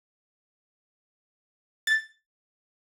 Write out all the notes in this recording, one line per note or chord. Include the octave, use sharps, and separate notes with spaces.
A6